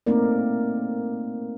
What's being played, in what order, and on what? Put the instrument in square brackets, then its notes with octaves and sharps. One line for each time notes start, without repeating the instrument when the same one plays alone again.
[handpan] A3 A#3 C4 D#4 A#4 D5